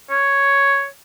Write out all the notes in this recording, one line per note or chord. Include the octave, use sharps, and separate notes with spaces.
C#5